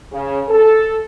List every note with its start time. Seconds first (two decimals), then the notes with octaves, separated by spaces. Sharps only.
0.12 C#3
0.48 A4